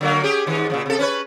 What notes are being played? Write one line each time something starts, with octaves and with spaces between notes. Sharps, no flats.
D3 F#3 A#3
C#4 G4 G#4
G#2 D#3
A#2 C#3 E3
C3 A4
C#4 B4 C#5